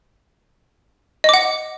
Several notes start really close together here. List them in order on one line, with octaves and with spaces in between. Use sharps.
D#5 D6 F#5